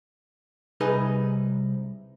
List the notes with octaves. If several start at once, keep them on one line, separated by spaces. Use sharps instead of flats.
C2 D#4 G#4 B4